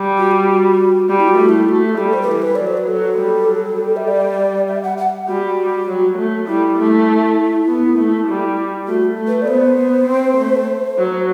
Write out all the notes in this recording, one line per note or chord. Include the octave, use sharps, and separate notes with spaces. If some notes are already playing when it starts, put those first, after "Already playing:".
Already playing: G3
F#4
G4
F#4
G3 G4
E4
F#4
A3
E4
A3 F#4
G4
G3 A4
C5
B4
E3 A4
B4
F#3 D5
C5
B4
F#3 A4
G3
F#3
G3
E5
D5
E5
F#5
F#5
G3 F#4
F#3
A3
G3 E4
A3
B3
A3
G3
A3 F#4
A3
B4
D5
B3 C5
B3
C4
A3
F#3